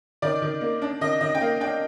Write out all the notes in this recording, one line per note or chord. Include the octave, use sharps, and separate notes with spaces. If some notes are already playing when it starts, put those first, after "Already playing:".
D#3 D5
D#3
A#3
D4
D#3 D#5
D#3 D#5
G5
A#3 F5
D4 G5